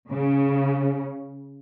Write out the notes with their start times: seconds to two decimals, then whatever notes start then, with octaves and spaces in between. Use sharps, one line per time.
0.11 C#3